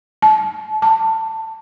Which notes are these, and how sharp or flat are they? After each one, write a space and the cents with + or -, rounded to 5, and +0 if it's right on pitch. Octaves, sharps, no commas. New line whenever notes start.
A5 -30
A5 +20